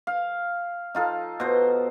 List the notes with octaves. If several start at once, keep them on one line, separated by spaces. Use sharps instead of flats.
F5
D#4 F4 A4
B2 C5